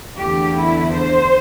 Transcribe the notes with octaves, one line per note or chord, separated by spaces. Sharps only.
E2 D3 A3 G4
E4
C5